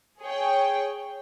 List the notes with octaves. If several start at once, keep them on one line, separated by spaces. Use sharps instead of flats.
G#4 C#5 G5